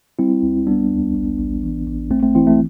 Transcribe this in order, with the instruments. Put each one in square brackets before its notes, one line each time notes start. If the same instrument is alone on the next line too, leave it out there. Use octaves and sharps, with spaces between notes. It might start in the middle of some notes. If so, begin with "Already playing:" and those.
[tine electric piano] G3 C4 E4
C2
G3 B3 D4
D2
A1
A1
E3
A1
A1 A3 C4
A3 C4
E3 C4 E4
A3